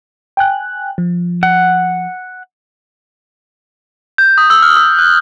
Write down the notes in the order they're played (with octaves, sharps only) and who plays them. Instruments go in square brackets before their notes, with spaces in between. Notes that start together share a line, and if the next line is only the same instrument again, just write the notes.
[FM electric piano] G5 G#5 F#6
F3
[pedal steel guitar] F#5
[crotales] G6
D#6
E6
F6
D#6
F#6